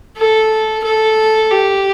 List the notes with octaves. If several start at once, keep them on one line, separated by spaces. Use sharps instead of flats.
A4
A4
G4